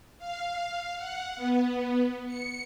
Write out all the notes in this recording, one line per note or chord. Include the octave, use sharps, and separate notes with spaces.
F5
F#5
B3
C#7